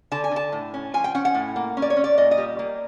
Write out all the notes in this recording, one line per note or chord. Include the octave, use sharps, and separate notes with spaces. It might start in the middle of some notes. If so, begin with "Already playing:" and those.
D3 A5
G#5
D3 A5
A2
C#4
F3 G#5
G5
C#4 F#5
F#5
A2
A#3
C#4
D5
C#5
C#4
D5
A#2 D#5
D#5
G3
A#3